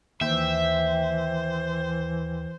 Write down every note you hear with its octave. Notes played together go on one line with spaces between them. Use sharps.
D#2 E3 C5 E5 G5